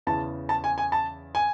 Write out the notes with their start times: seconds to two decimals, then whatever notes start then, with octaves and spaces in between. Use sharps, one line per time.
0.07 E2 C#3 E3 A5
0.49 A5
0.64 G#5
0.78 G#5
0.92 A5
1.35 G#5